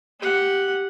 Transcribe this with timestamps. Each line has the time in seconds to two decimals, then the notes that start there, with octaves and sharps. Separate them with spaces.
0.20 G4 F#5